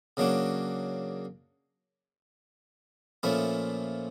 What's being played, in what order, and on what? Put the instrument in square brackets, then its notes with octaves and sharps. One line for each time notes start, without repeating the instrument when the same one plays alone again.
[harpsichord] C#3 F#3 A#3 D4 F#4
A#2 F3 A3 C#4 E4